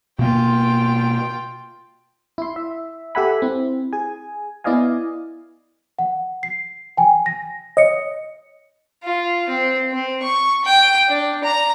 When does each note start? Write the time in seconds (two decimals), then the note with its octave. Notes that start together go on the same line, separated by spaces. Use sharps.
0.19 B2 A#3 F4 G5
2.38 E4 C6
2.56 E5
3.15 G4 A4 E5 F#5 G#5 B5
3.42 C4 E4
3.93 G#4 G#5
4.64 B3 E4 D5 D#5 F5 G#5
5.99 F#5
6.43 C7
6.97 G5 G#5
7.26 A#6
7.77 C#5 D#5 C#7
9.04 F4
9.49 C4
9.92 C4
10.23 C#6
10.65 G5
11.09 D4
11.44 A#5